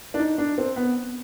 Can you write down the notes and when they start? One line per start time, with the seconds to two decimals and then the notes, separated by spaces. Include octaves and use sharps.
0.14 D4
0.19 D#4
0.38 D4
0.58 C4
0.76 B3